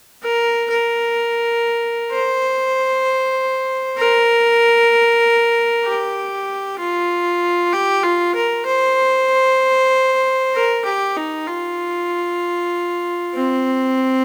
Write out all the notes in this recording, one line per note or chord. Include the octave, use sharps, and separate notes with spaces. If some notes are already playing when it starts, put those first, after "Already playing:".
A#4
A#4
C5
A#4
G4
F4
G4
F4
A#4
C5
A#4
G4
D#4
F4
C4